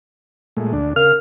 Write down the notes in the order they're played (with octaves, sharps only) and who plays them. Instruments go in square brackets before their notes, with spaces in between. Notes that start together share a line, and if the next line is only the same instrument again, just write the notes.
[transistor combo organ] A#2 G#3 A3
D2 D4
[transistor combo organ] C#3 F5 [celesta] A#4 [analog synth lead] F6